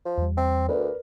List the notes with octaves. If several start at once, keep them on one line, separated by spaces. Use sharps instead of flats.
F3
E2 G3
C4
D2 A#4 B4 D5